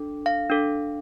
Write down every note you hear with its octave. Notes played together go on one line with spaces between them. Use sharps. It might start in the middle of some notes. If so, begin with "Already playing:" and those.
Already playing: D4 A4
F5
D4 A4